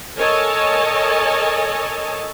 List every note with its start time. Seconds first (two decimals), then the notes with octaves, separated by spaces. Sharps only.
0.17 A4 A#4 C#5 D#5 G#5 A5